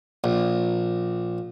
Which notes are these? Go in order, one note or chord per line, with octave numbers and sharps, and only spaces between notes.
A#1